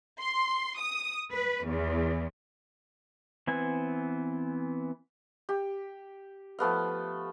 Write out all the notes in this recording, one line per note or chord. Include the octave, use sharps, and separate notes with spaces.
C6
D#6
B4
E2
E3 B3 C4 G#5
G4
F3 A3 B3 F5